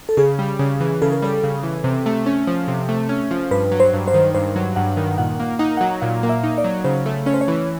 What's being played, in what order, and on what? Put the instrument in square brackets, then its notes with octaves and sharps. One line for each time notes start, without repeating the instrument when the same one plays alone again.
[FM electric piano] A4
[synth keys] C#3 [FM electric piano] G#4
[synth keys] G3
C#3
E3
[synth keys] C#3 [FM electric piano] A4
[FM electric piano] A#4
[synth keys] G3 [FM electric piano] A4
[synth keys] C#3
E3
C3
A3
C#4
F3
C3
A3
C#4
F3
[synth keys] G2 [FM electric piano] B4
[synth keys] F#3
[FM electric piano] C5
[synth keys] G2
[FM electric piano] C5
[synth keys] D#3
[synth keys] G2 [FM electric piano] C5
[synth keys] F#3
[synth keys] G2 [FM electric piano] F#5
[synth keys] D#3
[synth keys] A#2 [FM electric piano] F#5
[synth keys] A#3
[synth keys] D#4 [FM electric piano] F#5
[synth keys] F#3 [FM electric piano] F#5
[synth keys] A#2 [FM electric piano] F5
[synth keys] A#3
[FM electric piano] E5
[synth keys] D#4
[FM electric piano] D5
[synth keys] F#3
[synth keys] C#3 [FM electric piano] C5
[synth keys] A3
[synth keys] C#4 [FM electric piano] C#5
[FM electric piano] C5
C#5
[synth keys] E3